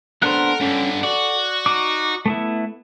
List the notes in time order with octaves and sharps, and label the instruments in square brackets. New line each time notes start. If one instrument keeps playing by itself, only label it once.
[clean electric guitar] B3 D4 C5 [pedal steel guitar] A4 F#5 F#6 [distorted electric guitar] A#4
[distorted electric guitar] G2 D3 [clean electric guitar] C#4
[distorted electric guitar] F#4 [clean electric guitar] D5
[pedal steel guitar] D#4 D6
A3 B3 E4